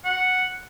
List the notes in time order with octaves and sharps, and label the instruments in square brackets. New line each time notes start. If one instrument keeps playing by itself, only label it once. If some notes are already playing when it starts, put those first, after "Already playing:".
[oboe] F#5